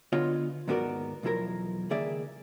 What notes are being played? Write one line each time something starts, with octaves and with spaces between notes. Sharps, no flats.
D3 B3 F4 C#5 D#5 C6
D#2 G#2 B3 F#4 A#4 D5
B1 E2 F3 E4 A#4 A#5
C#2 D#3 A#3 G#4 D5 E5